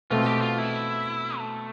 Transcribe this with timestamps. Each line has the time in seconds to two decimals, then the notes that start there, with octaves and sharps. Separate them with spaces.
0.11 B2 A3 C4 F4
0.26 G4
0.42 F4
0.58 E4
1.38 A3